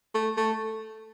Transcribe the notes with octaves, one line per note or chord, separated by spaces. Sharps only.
A3
A3